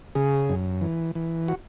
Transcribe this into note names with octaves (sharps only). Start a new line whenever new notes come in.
C#3 G#4
F#2
E3
E3
F#4